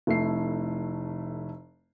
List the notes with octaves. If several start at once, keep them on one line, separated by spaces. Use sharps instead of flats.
F1 A3 E4 C7